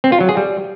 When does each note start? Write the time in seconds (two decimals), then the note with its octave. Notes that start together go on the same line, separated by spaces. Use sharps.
0.04 C4
0.12 F4
0.20 F#3
0.29 G#4
0.37 G3